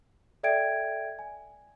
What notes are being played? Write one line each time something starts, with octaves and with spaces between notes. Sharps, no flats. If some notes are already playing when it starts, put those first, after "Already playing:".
A4 D5 E5 G5 G#6 D7
G#5